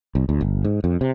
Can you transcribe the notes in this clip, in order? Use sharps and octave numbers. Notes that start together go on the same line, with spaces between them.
C2
D2
G1
G#2
F2
C3